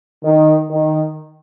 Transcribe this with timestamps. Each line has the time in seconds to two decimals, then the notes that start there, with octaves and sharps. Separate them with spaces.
0.25 D#3
0.70 D#3